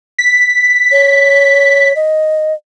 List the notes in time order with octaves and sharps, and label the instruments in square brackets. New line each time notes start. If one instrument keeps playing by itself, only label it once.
[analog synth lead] B6
[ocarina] C#5
D#5